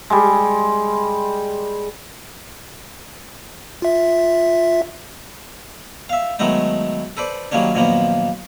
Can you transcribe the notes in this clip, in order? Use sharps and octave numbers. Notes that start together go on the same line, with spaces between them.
G3 G#3
F4 E5
E5 F5
D#3 F#3 G#3 A3 B3 D#4
A4 B4 C5 D5
D#3 F#3 G3 A#3 C#4 D4
F#2 A#2 D#3 F3 A#3 B3